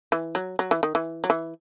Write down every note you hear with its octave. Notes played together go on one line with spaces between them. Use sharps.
E3
F#3
F#3
E3
D#3
E3
F#3
E3